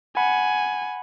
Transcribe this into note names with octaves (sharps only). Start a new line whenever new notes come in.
F#5 G#5 B5